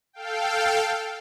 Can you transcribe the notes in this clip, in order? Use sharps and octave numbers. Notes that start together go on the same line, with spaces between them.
A4 F5 G5